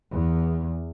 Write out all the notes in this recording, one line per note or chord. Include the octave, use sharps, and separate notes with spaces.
E2